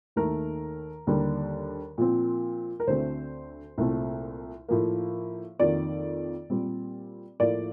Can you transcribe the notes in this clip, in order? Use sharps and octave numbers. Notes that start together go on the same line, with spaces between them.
D#2 D#3 A3 A#4
D#2 D3 G3
A#2 F3 C4
A#4
D2 D3 A3 C4 C5
C2 A#2 A3 C4
A2 F3 A#3
F2 D#3 A#3 D5
A#2 G3 C4
A2 F3 A#3 D5